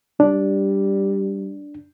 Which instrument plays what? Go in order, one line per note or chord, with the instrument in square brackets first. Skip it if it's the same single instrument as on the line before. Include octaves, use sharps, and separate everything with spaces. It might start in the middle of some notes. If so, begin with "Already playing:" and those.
[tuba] G3 [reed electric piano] D4